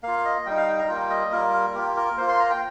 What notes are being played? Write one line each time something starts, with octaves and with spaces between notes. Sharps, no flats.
A#3 F4 F5
D#5
G3 D#4 G5
F5
G5
A#5
G3 A#3 F4 G5
D#5
G3 A#3 F4 A#4
A#4
A#3 F4 G4
A#4
A#3 F4 C5
C6
A#5
G5